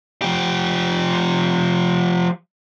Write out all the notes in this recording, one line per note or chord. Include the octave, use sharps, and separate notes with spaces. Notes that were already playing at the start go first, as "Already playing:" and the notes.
F3 G4